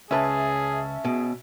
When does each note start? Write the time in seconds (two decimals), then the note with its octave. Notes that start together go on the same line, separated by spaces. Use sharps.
0.11 C#2 C#4 G#4 B4 E5 A5
1.05 B2 G#4